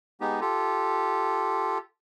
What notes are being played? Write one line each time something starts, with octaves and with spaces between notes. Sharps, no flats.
G#3 B3 D#4 G4
F4 G4 A4